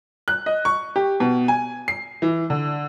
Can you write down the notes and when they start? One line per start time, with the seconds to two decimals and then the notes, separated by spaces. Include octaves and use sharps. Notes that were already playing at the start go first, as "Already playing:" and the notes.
0.28 F#6
0.46 D#5
0.65 C#6
0.96 G4
1.20 B2
1.48 G#5
1.88 C7
2.22 E3
2.50 D3